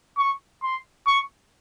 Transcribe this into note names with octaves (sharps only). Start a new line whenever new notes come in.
C#6
C6
C#6